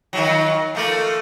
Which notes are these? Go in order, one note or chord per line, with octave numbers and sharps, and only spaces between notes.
D#3 F3 F#3
F3 A3 A#3